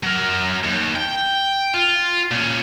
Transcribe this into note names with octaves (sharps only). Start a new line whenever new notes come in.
F#3 A#4
D#2
G5
F4
A#2 C#4